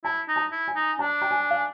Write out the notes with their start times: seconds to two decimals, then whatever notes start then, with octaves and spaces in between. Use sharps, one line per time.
0.04 E4 A5
0.28 D#4
0.36 A5
0.52 E4
0.68 G#5
0.75 D#4
0.99 D4 A5
1.22 G5
1.31 G#5
1.51 F5